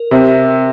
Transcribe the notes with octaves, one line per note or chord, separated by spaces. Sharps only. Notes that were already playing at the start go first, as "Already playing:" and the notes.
Already playing: A#4
C3